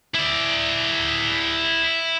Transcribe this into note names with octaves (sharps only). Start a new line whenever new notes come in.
E4 D5